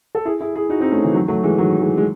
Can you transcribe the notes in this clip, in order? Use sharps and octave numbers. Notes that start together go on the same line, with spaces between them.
A4
E4 G#4
E4 G#4
E4 G#4
D#4 F#4
C4 D#4
A3 C#4
C#3 E3
D#3 F#3
F#3 A3
E3 G#3
D#3 F#3
E3 G#3
G#3